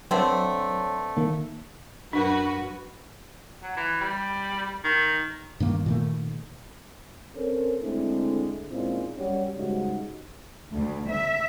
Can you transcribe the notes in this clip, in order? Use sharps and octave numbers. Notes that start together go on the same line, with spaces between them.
D3 F#3 A3 C4 B4 C#5 A5 C6
D#3 A#3
F#2 D4 F#4 A#4 B4
F#3
E3
G3
D#3
G2 D#3 A#3
A#2 D#3 A3
C4 C#4 A4 A#4 C5 C#5
D3 G#3 A3 C4 D4 E4
A#2 G#3 C4 C#4 D#4 E4
F#2 G3 C#4 F#4 C#5
G#2 C#3 G3 G#3 D#4 F#4
D2
E5